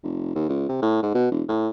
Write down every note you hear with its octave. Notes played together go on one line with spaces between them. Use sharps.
F1
D#2
C#2
C3
A2
G#2
B2
E1
A2